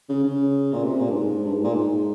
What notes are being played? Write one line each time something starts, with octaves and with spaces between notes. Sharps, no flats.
C#3
C#3
A#2
C3
A#2
G2
G#2
G2
G#2
A#2
G#2